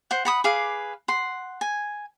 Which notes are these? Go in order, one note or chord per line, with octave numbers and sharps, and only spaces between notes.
C5 F#5
F#5 B5 D#6
G#4 B4 F5 D6
F#5 C6
G#5